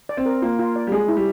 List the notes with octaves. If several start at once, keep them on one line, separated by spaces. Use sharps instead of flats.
D5
C4
A#4
A#3 F4
F4
D5
G3
G#3 G#4
E4
G3